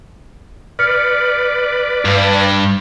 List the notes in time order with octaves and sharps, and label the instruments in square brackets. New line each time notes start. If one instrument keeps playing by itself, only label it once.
[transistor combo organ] B4 D5 [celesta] F6 C#7
[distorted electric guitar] G2